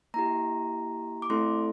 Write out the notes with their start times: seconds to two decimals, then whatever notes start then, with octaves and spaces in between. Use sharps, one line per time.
0.14 A#3 E4 G4 A#5
1.22 D6
1.30 A3 C4 E4 A4 C6